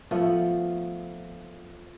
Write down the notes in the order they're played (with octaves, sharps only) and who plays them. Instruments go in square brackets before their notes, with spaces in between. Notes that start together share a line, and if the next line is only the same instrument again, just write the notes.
[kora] F3 A3 B3